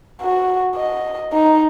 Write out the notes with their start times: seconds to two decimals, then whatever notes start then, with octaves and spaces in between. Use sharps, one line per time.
0.22 F#4
0.75 D#5
1.33 D#4